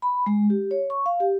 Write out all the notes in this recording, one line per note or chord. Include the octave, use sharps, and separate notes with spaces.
B5
G#3
G4
C#5
C#6
F5
G4